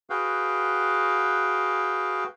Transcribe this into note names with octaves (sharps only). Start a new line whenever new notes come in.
F#4 G#4 B4 F5 G5